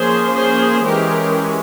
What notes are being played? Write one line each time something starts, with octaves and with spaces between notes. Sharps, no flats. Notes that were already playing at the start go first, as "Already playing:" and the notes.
Already playing: F3 A#3 C#4 G#4 C5
G#4 C5
E3 G#3 C#4 G4 A#4